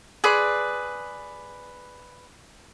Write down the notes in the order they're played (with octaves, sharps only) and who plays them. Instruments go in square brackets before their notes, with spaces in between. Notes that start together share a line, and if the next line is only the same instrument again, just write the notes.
[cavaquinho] G#4 B4 D5 C6